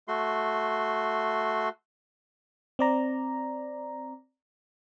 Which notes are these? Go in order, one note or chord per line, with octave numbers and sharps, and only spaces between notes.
A3 F#4 C6
C4 D5 A#5